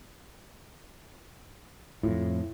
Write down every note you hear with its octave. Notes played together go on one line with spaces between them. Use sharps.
F2 A2 E4 F4